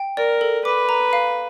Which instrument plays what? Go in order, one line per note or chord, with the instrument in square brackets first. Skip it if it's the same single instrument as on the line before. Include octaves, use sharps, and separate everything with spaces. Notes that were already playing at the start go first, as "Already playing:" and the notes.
Already playing: [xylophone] G5
[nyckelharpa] A#4 [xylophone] D5
[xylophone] A4
[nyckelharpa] B4 [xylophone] D6
[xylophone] A#5
F5